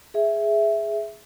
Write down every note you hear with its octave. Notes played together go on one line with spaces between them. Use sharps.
G#4 E5